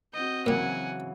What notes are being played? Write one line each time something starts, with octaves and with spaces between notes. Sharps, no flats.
C4 F#4 D#5 G6
A#2 C#3 E3 F#3 G4 F#5 G#5